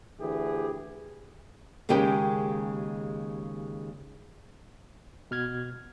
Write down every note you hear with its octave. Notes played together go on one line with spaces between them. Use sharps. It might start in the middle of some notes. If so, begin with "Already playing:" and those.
D2 E3 G4 G#4
D#2 C#3 G#3 G4 A#4 G5
B2 F6 G#6